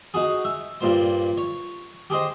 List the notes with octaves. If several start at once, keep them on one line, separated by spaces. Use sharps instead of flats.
D#4 F#4 G#4
E5
G2 A#2 C5
C#5
G4 G#4 C5 D#5